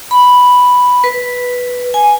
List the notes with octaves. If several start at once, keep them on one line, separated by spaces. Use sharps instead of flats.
B5
B4
G#5